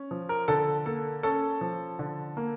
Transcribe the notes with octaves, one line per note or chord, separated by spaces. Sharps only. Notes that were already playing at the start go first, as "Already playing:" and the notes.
Already playing: C#4
F3
A#4
D3 A4
A#3 A4
C#4 A4
F3
D3
A#3